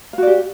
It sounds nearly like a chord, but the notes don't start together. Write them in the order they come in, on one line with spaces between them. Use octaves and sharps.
F5 F#4 D5 G4